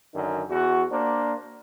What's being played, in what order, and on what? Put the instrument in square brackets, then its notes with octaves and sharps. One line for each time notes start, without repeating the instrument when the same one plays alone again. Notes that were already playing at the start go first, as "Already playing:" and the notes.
[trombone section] F#2 D3 D#3
E2 F#4
A#3 D4 C5